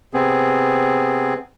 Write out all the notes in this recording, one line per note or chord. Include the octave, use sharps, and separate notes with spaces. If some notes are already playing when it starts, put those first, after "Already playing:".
C3 B3 C4 G#4